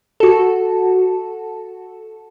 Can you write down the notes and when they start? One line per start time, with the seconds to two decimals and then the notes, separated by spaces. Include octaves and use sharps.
0.20 F#4 A4